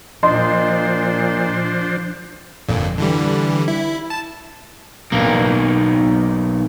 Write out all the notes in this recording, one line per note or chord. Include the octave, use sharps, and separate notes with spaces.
A#2 F3 D4 C5 D#5 C6
G1 F2 A#2
D3 E3 G3
E4
A5
B1 A#3